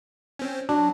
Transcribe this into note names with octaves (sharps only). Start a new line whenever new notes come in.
C4 C#4
F#3 D4